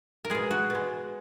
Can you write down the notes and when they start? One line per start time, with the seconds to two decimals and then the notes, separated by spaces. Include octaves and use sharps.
0.25 A#4
0.30 B2 G#3 G#4
0.51 F#4
0.70 B2 G#3